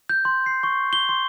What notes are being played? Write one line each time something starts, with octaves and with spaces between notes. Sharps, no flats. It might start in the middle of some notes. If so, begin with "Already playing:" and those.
G6
C6
C7
C#6
G7
C6